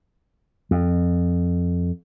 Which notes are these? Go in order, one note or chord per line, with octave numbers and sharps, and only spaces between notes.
F2